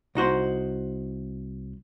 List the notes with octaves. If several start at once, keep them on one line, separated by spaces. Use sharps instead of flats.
C2 D#4 F#4 C5